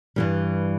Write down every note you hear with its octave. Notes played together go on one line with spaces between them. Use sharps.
G2 E3 G3